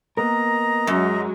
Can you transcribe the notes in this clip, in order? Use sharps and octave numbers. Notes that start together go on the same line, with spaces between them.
A#3 B3 A#4 D#5 A#5
F#2 F#3 G#3